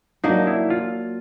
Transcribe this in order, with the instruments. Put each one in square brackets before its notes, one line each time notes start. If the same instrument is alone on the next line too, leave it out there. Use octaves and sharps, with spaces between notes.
[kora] F#3 A#3 D4 [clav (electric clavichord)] D#4
[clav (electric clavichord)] E4
F4